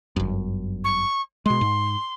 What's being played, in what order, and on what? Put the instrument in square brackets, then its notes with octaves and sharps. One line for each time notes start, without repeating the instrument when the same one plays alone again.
[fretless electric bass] G1 F#2
[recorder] C#6
[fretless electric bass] B2 G#3 [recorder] C6
[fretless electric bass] G#2